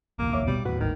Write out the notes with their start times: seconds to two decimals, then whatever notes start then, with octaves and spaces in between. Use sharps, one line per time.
0.19 F1 A#1 D#2 A#3
0.33 C#5 E5 D6
0.47 B2 G3
0.65 D#2 A2 F#4 B4
0.81 G#1 D#3